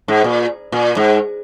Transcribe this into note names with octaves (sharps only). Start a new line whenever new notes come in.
G#2
A#2
A#2
G#2